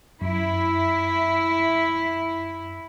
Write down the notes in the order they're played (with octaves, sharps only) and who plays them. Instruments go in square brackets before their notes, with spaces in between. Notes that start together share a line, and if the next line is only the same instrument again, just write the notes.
[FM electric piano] F#2 [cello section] E4